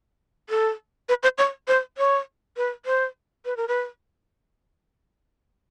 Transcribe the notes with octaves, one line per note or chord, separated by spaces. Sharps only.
A4
B4
C5
C#5
C5
C#5
B4
C5
B4
A#4
B4